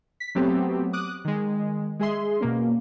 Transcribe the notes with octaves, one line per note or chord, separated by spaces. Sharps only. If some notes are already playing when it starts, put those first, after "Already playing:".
B6
F#3 A3 B3 C4 G4
D6 D#6 F#6
D#3 G#3
G#3 G#4 E5 C6
B2 A#3 C#4